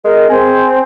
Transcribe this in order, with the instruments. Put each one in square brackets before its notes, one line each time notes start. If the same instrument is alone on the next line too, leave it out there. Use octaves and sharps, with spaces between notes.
[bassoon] G#3 [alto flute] A#4
[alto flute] C4 [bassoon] G#4